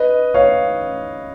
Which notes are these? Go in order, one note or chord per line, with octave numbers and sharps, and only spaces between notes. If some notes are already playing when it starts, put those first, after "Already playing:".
Already playing: B4 D#5
C#5 F5